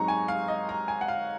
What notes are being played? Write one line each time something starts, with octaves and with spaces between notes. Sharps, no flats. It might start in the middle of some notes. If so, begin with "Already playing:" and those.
Already playing: G#2 F#3 C4 D#4 A#5 C#6
G#5
F5
D#5
A#5
G#5
F#5
F5